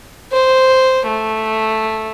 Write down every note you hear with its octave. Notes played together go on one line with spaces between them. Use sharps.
C5
A3